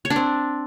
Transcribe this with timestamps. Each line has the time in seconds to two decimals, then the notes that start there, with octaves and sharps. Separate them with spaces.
0.05 C#5
0.10 D4
0.16 C4